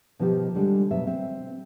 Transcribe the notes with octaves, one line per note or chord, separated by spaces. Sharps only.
B2 D#3 F3 D#4 G4
D3 G3 G#3
B2 F#3 E5
C4 E5